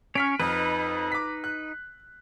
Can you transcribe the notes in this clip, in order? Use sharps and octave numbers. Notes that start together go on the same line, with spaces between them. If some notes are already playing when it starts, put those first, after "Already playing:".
C#4 C#5 F6 B6 D7
F2 D#4 B4
D6 B6
F#6